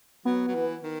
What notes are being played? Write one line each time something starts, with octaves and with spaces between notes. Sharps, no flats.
F#3 B3
F#3
E3
D#3